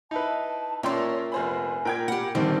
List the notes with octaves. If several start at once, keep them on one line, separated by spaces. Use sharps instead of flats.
D#4 E4 B4 A5
A#2 C#4 A#4 C#5 D5 E5 G5 C6
F1 C5 G#5 B5
A#2 A#4 G5 G#6
G4 F#5 B5
A#1 D3 D#3 G3 C4 C5